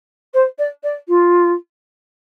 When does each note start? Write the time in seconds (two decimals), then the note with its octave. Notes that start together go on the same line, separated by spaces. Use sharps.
0.33 C5
0.58 D5
0.83 D5
1.08 F4